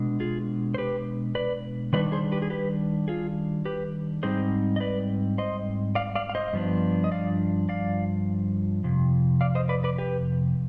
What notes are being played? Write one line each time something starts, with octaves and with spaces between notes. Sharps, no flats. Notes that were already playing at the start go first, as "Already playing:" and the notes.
Already playing: B2 G#3 D4
F4 G#4
C5
G4 B4
B4 D5
D#3 G3 D4 B4 D5
G#4 C5
G4 B4
G#4
G4 B4
F4 G#4
G4 B4
G#2 G3 C4 D#4 G#4 C5
D#5
B4 D5
C5 D#5
D5 F5
D5 F5
F5
C5 D#5
G2 F3 B3 D4
D#5
D5 F5
D5 F5
F2 C3
D5 F5
C5 D#5
B4 D5
B4 D5
G4 B4